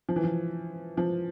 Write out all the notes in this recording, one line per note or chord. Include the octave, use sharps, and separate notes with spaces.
F3
E3
F3
F3